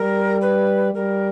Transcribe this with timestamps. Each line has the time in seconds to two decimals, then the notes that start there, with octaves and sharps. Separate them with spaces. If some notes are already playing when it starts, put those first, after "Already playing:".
Already playing: G3 A#4
0.41 B4
0.94 G3 A#4